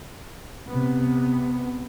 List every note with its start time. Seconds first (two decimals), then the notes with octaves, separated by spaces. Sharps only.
0.69 C3 B3